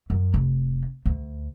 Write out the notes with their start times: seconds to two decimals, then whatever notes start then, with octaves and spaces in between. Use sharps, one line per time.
0.10 F#2
0.34 F1
1.06 D2